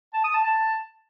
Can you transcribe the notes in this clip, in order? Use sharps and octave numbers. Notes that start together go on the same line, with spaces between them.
A5
D#6
A5
A5